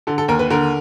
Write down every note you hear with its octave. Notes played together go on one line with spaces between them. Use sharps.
D3 A4
A4
D#2 A#4
B4
D3 A#4